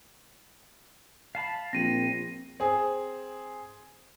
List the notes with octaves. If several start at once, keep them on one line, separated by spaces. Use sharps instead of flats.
F5 A5 B5
A#1 C4 A#6 D#7
C4 G#4